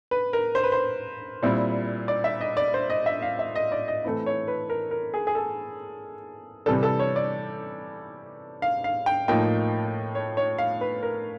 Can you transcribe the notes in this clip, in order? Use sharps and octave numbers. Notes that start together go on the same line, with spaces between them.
B4
A#4
C5
B4
C5
A#2 G3 C4 E4
D5
E5
D#5
D5
C5
D#5
E5
F5
E5
D#5
D5
D#5
E3 A3 C4 E4
C#5
B4
A#4
A#4
G#4
G#4
A4
C3 E3 G3 A4
A4
C#5
D5
F5
F5
G5
A2 F3 A#3 D#4 G5
C#5
C#5
F5
B4
A#4